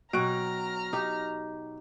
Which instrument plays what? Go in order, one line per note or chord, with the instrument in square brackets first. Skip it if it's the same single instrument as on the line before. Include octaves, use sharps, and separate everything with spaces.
[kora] B2 [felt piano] F#3 G5 [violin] A#5 F6 [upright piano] C#6 F#6 D7
[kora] D#4 G4